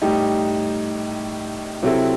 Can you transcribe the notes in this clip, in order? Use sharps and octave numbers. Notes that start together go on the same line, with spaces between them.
A2 G3 D#4 G4
C3 F#3 C4 E4 A4